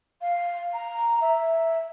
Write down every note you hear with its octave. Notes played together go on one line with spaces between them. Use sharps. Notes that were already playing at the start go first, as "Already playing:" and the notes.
F5
A#5
E5